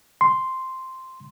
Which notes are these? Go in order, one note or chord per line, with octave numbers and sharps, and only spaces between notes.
C6